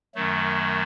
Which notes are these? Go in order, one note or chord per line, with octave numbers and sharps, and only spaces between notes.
F#2 D#3 F#3 A3